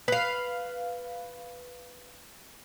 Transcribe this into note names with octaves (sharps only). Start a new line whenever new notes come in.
B4 F5